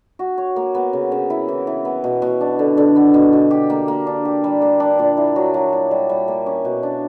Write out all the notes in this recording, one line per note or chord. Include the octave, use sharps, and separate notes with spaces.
F#4
C#5
A#3
B3
C#3
C#3
E4
E3
E3
B3
B2
B2
D4
D3
D3
B3
B2
B2
G4
A#3
A#3
D4
G4
G3
A#3
D4
A#2
E4
F#3
F#3
E4
G3
G3
A#3
C#4
B2
D4